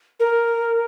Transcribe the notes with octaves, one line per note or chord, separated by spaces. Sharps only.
A#4